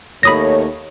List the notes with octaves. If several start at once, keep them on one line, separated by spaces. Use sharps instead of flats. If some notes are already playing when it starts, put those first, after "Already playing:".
D#2 A3 C#5 B5 D#6 A#6